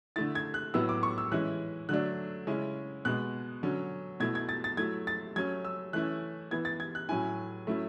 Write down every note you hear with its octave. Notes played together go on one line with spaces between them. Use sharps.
D3 A3 E4 A6
G#6
F#6
A2 F#3 B3 E4 E6
D6
C#6
E6
E3 G#3 C#4 E4 F#6
D3 F#3 A3 D4 F#6
C#3 G#3 C#4 E4
B2 G#3 B3 F#6
D3 F#3 C#4
B2 A3 E4 G#6
G#6
A6
A6
F#3 A3 E4 G#6
A6
F#3 A3 C#4 G#6
E6
E3 A3 C#4 E4 F#6
E3 B3 E4 G#6
A6
G#6
F#6
A2 F#3 C#4 E4 G#5
F#3 A3 C#4 E4